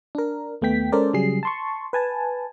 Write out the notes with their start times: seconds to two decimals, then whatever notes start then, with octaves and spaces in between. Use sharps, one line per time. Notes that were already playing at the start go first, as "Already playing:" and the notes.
0.15 D4 A#4
0.62 D#2 A3 B3 G5 B6
0.92 G#3 C#4 A4 A#4 C5 D5
1.13 C#3 F#3 G3 G#4 C7
1.43 A5 C6 C#6
1.93 B4 G#5 A5